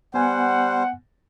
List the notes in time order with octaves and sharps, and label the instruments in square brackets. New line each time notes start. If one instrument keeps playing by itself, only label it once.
[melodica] G3 C5 [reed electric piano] B3 G#5 [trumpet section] F#5